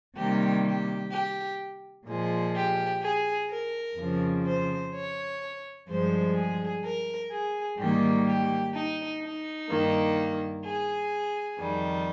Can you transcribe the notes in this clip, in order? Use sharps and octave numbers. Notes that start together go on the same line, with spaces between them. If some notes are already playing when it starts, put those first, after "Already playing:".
C3 D#3 G3 A#3 G4
G4
G4
A#2 F3 G#3
G4
G#4
A#4
F2 C#3 F3
C5
C#5
G2 F3 G#3 C5
G#4
A#4
G#4
G#2 D#3 G3 A#3 G4
G4
D#4
D#4
G2 D#3 A#3
G#4
F2 D#3 G3